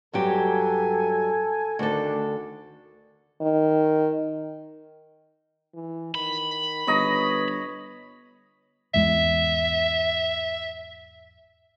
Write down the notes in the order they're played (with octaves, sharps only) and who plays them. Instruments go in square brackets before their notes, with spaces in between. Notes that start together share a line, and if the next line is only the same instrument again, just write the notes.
[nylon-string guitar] G2 F#3 G4 [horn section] A4 G#5
[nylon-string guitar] D2 A4 [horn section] D#3 D4
[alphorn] D#3
[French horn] E3
[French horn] D#3 [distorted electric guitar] B5
[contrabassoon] G1 [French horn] B4 [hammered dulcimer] C#5 D#5 A#5
[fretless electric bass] G#1 E2 G#3 [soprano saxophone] E5